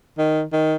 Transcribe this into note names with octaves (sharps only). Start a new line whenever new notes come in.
D#3
D#3